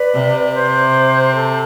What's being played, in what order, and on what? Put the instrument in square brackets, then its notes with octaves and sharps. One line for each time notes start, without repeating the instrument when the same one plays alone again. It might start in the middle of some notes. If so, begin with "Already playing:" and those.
Already playing: [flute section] B4 D5
[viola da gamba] C3
[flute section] C5
A4